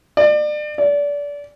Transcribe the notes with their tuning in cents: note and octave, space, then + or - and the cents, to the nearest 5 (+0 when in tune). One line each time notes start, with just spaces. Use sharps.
D5 +35
D5 -25